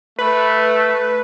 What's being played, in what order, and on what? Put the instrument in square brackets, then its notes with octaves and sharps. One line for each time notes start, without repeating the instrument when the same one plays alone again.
[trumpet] A3 [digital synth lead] B4